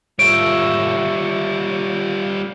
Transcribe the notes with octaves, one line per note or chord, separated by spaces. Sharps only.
G3 F4 C#5 E5 D7